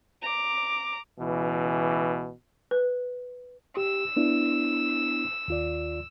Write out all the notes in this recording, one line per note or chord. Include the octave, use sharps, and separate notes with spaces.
A#5 D6
C#2 B2 E3
B4
G4 E6
B3 D4 E4
D#2 F4 D5